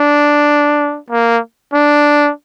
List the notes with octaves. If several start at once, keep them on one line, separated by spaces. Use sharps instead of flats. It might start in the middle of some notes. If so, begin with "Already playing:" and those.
Already playing: D4
A#3
D4